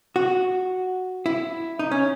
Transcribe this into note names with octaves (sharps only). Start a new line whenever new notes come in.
F#4
E4
D#4
C#4